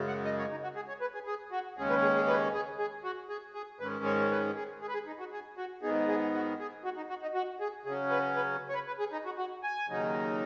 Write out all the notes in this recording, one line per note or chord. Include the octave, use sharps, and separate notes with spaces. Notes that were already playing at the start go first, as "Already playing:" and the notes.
Already playing: F#2 C#3 G#3
F#5
D#5
C#5
D#4
F#4
G#4
C#5
B4
G#4
G#4
F#4
D#2 C#3 G#3 C#4 G#4
B4
G#4
G#4
B4
G#4
G#4
F#4
G#4
G#4
G#2 D#3 G#3 C#4 B4
C#5
B4
G#4
G#4
B4
G#4
D#4
F#4
G#4
F#4
G#2 D#3 B3 D#4 G#4
G#4
F#4
G#4
F#4
D#4
F#4
D#4
F#4
G#4
C#3 F#3 C#4 G#4
B4
B4
C#5
B4
B4
G#4
D#4
F#4
F#4
G#5
D#2 C#3 F#3 D#4